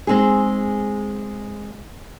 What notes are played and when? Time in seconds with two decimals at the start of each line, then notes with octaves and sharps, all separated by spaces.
0.07 G#3 C4 D#4 G#4